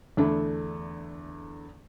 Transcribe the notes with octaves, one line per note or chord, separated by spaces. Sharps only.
E2 D3 A3 D4 E4